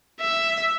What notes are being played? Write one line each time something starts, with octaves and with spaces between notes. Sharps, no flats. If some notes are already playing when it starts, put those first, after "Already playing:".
E5